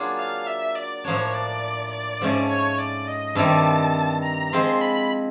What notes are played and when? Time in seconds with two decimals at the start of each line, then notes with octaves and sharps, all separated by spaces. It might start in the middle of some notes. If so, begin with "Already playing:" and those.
Already playing: F#3 A#3 D4 F4 G#4
0.18 F5
0.47 E5
0.75 D5
1.04 A2 F3 A#3 D4 C#5
1.34 D5
1.91 D5
2.21 G#2 F3 A3 C#4
2.49 C#5
2.78 D5
3.08 D#5
3.35 G2 D#3 G3 C4 E4 A5
4.23 A#5
4.52 F3 G#3 C4 C6
4.81 B5